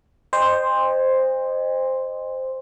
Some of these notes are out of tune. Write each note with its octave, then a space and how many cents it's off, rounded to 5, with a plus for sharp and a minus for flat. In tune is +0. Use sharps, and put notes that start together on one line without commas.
C5 +0 D#5 -20 G5 +45